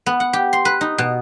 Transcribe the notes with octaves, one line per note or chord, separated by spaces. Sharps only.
B3
F#5
G4
C6
B4
D#4
B2